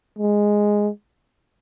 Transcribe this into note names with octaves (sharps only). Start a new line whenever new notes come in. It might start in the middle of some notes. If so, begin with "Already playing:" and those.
G#3